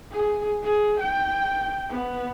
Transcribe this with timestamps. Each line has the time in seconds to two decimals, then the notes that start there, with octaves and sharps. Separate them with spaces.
0.12 G#4
0.63 G#4
1.00 G5
1.89 B3